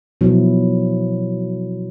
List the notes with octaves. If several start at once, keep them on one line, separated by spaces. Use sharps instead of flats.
B2 F3 F#3 E4